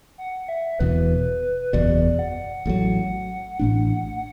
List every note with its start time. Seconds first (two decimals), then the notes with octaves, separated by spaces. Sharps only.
0.18 F#5
0.49 E5
0.80 E1 E2 B2 B4
1.73 F#1 E2 B2 D5
2.19 F#5
2.66 A1 A2 F#3 F#5
3.59 A1 A2 A3 D4